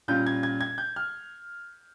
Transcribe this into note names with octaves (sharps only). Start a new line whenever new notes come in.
A#2 G3 C#4 F4 G6
G#6
G#6
G#6
G6
F6